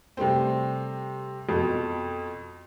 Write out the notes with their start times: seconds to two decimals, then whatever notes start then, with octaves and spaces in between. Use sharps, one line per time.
0.17 C3 G3 A3 C4
1.49 F2 B2